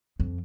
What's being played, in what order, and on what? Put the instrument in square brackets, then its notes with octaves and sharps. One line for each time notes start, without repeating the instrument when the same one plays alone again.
[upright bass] F2